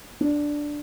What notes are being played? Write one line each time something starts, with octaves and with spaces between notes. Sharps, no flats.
D4